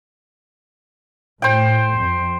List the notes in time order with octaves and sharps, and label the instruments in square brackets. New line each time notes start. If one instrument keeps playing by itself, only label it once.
[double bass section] A2 [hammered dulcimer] C5 G5
[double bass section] F2